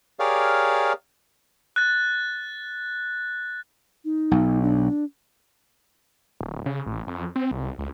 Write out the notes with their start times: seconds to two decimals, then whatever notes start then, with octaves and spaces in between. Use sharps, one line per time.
0.19 G4 G#4 A#4 C#5 D5 F5
1.76 F#6 A6
4.05 D#4
4.31 B1
4.62 D4
6.41 D1
6.66 C#3
6.86 A1
7.07 F2
7.36 C4
7.51 C2
7.78 C#2